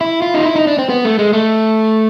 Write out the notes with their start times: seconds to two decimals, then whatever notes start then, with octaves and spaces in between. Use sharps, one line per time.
0.01 E4
0.22 F4
0.34 D#4
0.45 E4
0.56 D#4
0.67 D4
0.79 C4
0.89 B3
1.04 A3
1.19 G#3
1.33 A3